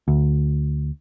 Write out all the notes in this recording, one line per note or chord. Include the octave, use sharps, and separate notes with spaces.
D2